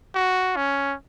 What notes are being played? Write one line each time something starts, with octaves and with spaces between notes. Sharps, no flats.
F#4
C#4